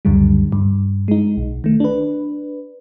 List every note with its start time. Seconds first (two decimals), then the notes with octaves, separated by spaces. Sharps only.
0.05 C#2 F#2 D3 G3
0.52 G2
1.08 G#3 D#4
1.37 B1
1.64 D#3 A3
1.80 D4 B4